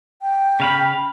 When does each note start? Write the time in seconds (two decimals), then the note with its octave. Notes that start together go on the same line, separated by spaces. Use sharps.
0.22 G5
0.60 C#3 F5 B5